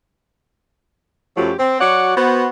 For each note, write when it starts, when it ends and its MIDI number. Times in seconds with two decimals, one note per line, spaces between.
1.37 1.52 42
1.37 1.52 53
1.37 1.52 54
1.37 1.52 57
1.37 1.52 66
1.37 1.52 67
1.59 1.78 60
1.80 2.13 54
1.80 2.13 66
1.80 2.13 73
1.80 2.13 74
1.80 2.13 78
2.16 2.48 59
2.16 2.48 66
2.16 2.48 72